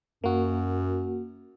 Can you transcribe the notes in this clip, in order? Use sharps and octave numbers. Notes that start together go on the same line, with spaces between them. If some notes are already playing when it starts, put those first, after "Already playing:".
F#2 A#3 F#4